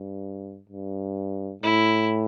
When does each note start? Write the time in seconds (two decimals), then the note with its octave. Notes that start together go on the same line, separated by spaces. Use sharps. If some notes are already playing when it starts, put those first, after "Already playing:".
Already playing: G2
0.70 G2
1.63 A2 E4